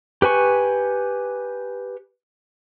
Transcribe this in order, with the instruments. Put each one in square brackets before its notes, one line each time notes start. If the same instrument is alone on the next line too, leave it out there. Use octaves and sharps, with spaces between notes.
[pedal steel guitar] G4 B4 G#5 C#6